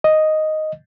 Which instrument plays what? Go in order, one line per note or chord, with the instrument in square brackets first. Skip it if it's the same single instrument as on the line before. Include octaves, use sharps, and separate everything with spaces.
[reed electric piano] D#5